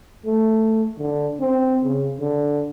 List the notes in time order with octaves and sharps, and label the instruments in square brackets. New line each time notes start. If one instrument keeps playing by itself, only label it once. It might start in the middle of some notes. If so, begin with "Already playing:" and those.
[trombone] A3
D3
C4
C#3
D3